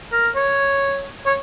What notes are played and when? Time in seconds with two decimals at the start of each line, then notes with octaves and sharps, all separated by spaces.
0.12 A#4
0.36 C#5
1.26 C#5